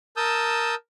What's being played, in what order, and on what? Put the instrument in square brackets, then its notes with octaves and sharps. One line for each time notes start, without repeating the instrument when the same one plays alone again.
[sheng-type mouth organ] A#4 A5 D#6 E6 G6